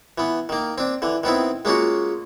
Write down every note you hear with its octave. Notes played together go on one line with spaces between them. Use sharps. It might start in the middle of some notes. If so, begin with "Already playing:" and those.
E3 B3
D#3 A#3
C4 D4
D3 E3
D#3 B3 C4 E4
G#3 A#3 C#4 F4 F#4